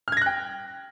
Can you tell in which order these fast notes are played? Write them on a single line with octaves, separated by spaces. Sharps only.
F6 G#6 A#6 F#6 G5